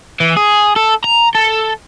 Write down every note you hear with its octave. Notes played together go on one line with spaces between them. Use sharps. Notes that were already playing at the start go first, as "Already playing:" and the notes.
E3
G#4
A4
A#5
A4